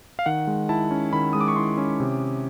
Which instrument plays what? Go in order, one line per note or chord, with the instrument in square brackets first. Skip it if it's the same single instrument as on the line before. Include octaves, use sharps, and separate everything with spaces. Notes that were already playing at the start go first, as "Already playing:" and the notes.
[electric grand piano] F5
D#3 F#5
G#3
E4 A5
C#4
D#3 B5
G#3 D#6
D6
C#6
E4 C6
C#4
C3